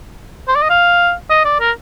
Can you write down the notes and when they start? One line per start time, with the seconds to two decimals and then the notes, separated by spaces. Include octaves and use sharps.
0.48 C5
0.55 D5
0.62 D#5
0.70 F5
1.30 D#5
1.45 D5
1.61 A#4